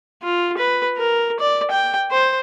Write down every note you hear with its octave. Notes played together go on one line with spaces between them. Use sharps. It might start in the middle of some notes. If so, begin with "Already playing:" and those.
F4
B4
A#4
D5
G5
C5